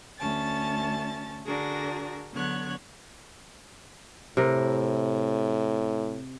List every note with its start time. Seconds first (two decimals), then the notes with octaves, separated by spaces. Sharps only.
0.18 D2 C#4 A5 A6
1.46 D3 D4 F#4 G#4 A#4 A#6
2.32 D3 F#3 B3 C#5 F#6 G#6
4.37 A2 C3 A#4